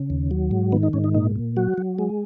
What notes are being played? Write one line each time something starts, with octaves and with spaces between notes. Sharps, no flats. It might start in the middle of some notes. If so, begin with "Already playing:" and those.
Already playing: C#3
D#2
F#3
G#2
D#3 B3
D#4
G#2 C#4
D#4
A#2 D#4
A#2
F#3 F#4
F#3
G#3